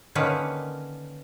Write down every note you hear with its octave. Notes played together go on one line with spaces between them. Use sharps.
D3 D#3 A#3 C#4 B4